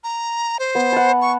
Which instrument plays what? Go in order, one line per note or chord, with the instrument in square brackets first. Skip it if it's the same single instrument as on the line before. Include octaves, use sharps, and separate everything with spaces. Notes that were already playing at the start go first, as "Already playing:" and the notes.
[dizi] A#5
C5
[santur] B3
F#5 A5
[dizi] C#6